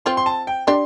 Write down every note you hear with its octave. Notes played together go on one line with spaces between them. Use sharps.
C4 F4 C6
C6
A5
G5
D4 G4 C6